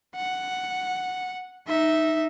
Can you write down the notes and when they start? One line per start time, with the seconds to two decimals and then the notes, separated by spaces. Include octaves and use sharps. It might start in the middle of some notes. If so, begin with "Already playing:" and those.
0.15 F#5
1.68 D#4 E5